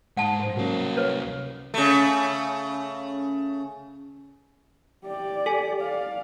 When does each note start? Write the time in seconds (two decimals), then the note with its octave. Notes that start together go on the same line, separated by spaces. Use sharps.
0.17 G#2 G#3 F#5 A5
0.40 C5
0.56 C2 F#3 A#3 C#4 F5
0.97 B4 C#5
1.74 C#3 A3
5.05 G4 D5
5.46 A4 G#5
5.80 D5 F5